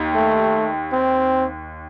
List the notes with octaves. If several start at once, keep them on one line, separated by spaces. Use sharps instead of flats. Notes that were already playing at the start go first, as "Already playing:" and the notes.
Already playing: D#2 G4
A3
C4